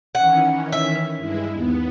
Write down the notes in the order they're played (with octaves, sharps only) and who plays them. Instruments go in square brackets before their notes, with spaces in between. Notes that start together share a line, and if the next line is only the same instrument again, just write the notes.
[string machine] D#3 E3 C#4 [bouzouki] F#5
[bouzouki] E5
[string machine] G2 G#3 E4
D#2 B3